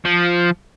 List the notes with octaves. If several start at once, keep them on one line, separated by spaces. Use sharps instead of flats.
F3